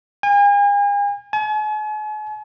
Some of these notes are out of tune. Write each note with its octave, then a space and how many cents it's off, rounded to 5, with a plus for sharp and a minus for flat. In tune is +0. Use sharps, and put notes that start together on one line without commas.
G#5 -40
G#5 +45